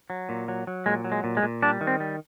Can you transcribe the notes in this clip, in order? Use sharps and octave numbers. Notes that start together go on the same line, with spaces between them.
F#3
A#2
F#3
F#3
A#2 G#3
F#3
G#3
A#2
G#3
A#2
G3 D4
D#3
C4
G3